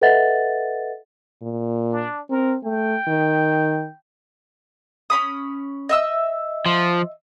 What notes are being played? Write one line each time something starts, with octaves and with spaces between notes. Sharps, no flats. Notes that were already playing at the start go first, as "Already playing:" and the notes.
A4 B4 D#5 E5 F#5 A6
A#2
D4
C4 A#4
A3 G5
D#3
C#4 B5 D#6
D#5 E5 E6
F3